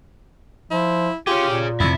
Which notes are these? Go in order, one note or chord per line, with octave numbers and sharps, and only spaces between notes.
F3 E4
F4 G4 G#4 C#5
A#2
F2 C3 E4 E5